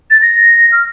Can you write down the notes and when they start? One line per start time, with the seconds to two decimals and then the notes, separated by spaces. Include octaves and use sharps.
0.10 A6
0.22 A#6
0.72 F6